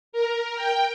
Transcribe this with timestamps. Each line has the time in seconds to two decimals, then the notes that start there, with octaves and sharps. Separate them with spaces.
0.13 A#4
0.56 G5